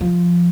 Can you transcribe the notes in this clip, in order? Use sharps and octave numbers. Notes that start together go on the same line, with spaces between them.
F3